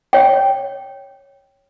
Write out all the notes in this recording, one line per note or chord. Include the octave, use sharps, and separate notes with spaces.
C#5 G5